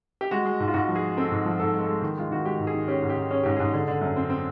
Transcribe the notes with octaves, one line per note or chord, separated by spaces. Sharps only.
G4
G#3 F#4
G#3
G#2
F4
G#2 F#4
F3
G#4
G#3
C4 A4
G#2
F3
G#2 A4
G#3
A4
G#3
D#3
G#3 F4
D#3 F#4
G#3 G4
G#2
G#4
D#3
C#4 G4
G#2
G4
D#3
C#4 G#4
G#2 G4
G#4
G#2
D3 G#4
D3
F#2
C4
C4